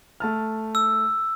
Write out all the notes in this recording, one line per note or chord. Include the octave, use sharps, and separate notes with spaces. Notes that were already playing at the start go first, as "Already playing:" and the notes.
A3 A5 F6
E6